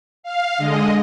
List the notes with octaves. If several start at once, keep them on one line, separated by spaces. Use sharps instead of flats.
F5
D3 G#3 D#5